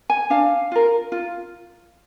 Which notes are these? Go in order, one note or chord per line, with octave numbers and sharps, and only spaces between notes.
G#5
D4 F5
F4 A#4
F4